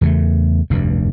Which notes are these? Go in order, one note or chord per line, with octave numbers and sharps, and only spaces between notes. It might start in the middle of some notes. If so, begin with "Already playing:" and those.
E2 C#3 A3
F1 D2 G2